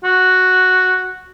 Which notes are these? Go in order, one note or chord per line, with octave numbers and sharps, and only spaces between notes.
F#4